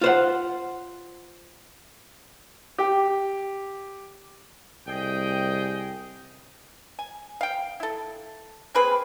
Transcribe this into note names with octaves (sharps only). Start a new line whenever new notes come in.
F4 C5 F#5
G4
C2 G#4 D#5 G5
G#5
F5 G5
E4 A4
A#3 C4 G#4 B4